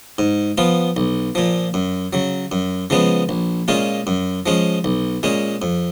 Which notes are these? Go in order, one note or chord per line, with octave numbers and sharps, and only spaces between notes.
G#2
F3 B3 F4
B1
A#2 F3
F#2
C#3 F#3
F#2
C#3 F3 G#3 B3
A#1
A#2 G#3 C#4 F4
F#2
F3 G#3 C#4
B1
A#2 G#3 C#4
F2